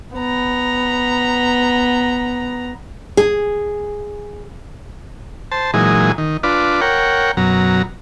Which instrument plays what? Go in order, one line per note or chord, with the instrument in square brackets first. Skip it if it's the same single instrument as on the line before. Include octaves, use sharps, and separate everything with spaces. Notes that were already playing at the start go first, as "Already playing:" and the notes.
[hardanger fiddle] B3 A#5
[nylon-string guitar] G#4
[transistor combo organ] C5 A5
A#2 E3 F#3 G#3 D#4 G#4
D#3
D4 F4 B4 D5
A#4 C#5 F#5 G5
F#2 B2 F#3 A#5